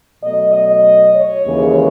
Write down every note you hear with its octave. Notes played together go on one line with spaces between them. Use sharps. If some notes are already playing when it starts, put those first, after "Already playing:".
B2 F#3 A3 D#5
D#5
C#5
D#2 C#3 E3 G#3